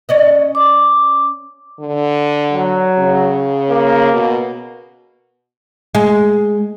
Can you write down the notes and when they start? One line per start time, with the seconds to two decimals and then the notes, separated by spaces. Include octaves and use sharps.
0.09 C#4 D5 D#5
0.55 D6
1.80 D3
2.53 F#3
2.98 C#3
3.70 A#3
4.12 B2
5.95 G#3